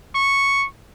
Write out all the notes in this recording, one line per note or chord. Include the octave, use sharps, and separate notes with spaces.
C#6